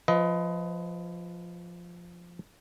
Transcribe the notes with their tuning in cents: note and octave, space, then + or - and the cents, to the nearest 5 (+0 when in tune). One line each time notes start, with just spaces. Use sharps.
F3 +0 B4 +25 D#5 +20